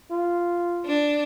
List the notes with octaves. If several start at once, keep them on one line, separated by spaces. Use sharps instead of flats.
F4
D4